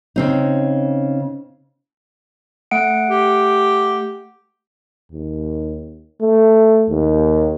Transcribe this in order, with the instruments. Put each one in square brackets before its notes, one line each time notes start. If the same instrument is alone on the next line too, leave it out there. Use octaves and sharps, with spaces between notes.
[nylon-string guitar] C#3 C4 D#4
[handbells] A3 F#5 D7
[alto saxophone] G4
[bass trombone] D#2
A3
D#2